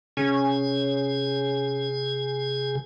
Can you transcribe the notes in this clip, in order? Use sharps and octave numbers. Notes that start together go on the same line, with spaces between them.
C3 C#4 G#4 G#5